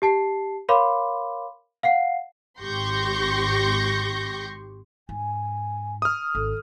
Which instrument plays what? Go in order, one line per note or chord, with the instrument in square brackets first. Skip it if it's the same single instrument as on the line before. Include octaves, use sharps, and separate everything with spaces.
[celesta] G4 A5 C7
A#4 C#5 F5 B5 C6 D6
F5 F#5 C7
[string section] G#1 G4 C6 C#6 G6 A#6
[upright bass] G#2 [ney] G#5
[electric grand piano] D#6 F6
[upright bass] G#1 [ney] A4